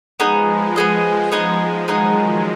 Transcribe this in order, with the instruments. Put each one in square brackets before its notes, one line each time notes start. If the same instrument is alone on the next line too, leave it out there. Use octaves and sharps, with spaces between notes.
[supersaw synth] F3 G#3 [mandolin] B3 D#4 G#4 D#5
[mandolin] B3 D#4 G#4 D#5
B3 D#4 G#4 D#5
[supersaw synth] D#3 F#3 [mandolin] B3 D#4 G#4 D#5